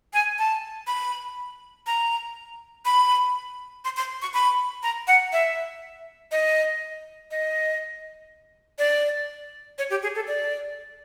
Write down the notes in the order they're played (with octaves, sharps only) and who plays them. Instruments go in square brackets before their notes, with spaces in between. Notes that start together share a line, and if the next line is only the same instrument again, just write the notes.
[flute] G#5
A5
B5
A#5
B5
C6
C6
C#6
B5
A#5
F#5
E5
D#5
D#5
D5
C#5
G4
G#4
A4
D5